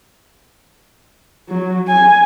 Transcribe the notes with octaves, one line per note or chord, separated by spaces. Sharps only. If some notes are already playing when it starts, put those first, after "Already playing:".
F#3
G#5